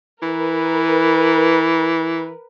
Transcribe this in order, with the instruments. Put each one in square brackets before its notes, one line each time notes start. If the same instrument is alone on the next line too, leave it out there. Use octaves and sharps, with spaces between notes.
[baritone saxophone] E3 [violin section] A#4 B4